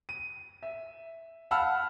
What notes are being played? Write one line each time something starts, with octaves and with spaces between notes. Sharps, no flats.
D#7
E5
F5 F#5 A5 B5 E6 F6